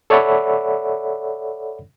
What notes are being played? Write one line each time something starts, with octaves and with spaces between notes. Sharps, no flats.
A4 C#5 D5 E5 F#5 B5